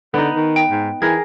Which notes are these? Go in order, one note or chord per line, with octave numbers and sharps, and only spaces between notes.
D3 B3 D#4
D#3
G5
G#2
E3 G#4 A#4 G#6